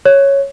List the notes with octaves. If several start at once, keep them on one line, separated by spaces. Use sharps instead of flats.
C#5